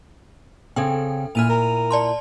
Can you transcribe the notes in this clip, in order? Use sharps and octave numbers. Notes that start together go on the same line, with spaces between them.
C#3 C4 A4 G5
A#2 E4 G#5 F6 D#7 F7
A#4
D5 A5 C6